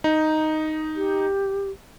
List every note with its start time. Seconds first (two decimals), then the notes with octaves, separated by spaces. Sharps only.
0.04 D#4
0.96 G4